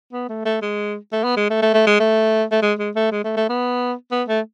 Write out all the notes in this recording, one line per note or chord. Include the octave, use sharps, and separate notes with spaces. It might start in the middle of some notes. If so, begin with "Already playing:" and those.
B3
A3
A3
G#3
A3
B3
G#3
A3
A3
A3
G#3
A3
A3
G#3
G#3
A3
G#3
A3
A3
B3
B3
A3